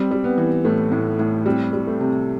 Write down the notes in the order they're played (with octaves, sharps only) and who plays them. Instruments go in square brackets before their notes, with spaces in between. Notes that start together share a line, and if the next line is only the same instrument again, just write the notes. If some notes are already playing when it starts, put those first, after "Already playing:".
Already playing: [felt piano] G3 [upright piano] C4
[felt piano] G3
[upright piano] B3
[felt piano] E3
[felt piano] A2 [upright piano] A3
[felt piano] A2
A2
[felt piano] G3 [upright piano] C4
[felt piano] G3
[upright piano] A3
[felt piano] C3